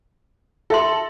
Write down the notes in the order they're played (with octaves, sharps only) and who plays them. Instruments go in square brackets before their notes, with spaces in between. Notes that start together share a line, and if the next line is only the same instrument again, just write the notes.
[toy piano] F4 E5 C6 [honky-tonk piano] A4